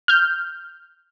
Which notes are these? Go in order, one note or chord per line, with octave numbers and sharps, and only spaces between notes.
F6 G6